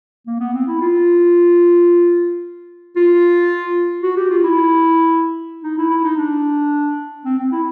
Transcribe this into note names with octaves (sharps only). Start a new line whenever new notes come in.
A#3
B3
C4
E4
F4
F4
F#4
G4
F4
E4
D#4
E4
E4
D#4
D4
C4
C4
E4